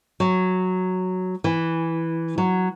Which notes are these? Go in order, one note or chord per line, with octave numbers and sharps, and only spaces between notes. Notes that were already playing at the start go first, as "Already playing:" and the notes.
F#3
E3
F#3